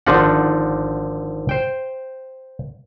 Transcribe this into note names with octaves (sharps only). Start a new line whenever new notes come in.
G#1 D3 F3 D4 D#4 F#5
C5 G5